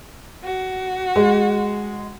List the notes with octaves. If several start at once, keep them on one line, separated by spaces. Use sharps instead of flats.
F#4
G#3